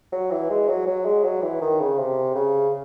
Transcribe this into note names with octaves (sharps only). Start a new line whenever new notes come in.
F#3
E3
G#3
F#3
F#3
G#3
F#3
E3
D#3
C#3
C3
C#3